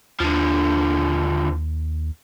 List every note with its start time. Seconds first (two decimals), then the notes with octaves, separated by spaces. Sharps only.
0.20 D#2 D3 F3